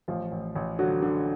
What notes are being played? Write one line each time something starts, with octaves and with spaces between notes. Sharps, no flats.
A1 F3 F4
A1
A1
D3 F#3 F#4
D3